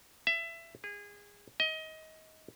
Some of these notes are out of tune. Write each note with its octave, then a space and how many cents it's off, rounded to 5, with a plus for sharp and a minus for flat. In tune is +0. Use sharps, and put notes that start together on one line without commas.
E5 +20
G#4 -25
D#5 +25